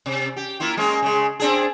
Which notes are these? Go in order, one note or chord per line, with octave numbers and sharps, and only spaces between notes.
C3
G4
A#3 E4 F4
G#3 A#3 C#4
C#3 G#3
C4 D4 G#4